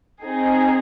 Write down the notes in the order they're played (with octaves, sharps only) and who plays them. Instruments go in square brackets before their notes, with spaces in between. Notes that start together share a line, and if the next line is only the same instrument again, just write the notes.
[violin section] C4 D#4 G#4